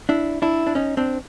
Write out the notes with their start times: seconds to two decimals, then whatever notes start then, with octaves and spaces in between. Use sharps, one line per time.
0.09 D4 E4
0.42 D4 E4
0.67 D4
0.75 C#4 D#4
0.97 C4 D4